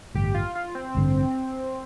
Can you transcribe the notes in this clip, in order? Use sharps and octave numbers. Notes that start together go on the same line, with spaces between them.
A1 G2 D3 G4
F4
F4
C4
A1 G2 D3